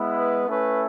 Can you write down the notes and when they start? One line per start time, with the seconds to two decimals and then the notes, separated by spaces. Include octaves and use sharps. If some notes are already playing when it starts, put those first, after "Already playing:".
Already playing: G#3 B3 E4
0.16 B4
0.47 A3 C#4 E4 B4